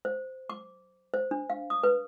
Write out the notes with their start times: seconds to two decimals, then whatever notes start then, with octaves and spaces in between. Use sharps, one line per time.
0.05 C5
0.50 D6
1.14 C5
1.31 D4
1.50 F5
1.70 D#6
1.83 B4